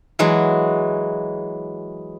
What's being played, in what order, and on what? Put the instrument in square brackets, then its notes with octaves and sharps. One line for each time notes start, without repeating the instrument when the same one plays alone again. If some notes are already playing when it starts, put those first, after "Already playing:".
[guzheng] E3 F#3 G#3 F#4